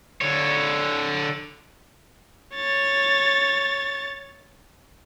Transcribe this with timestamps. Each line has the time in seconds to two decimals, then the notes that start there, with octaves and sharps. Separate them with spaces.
0.21 D3 C#5
2.55 C#5 A6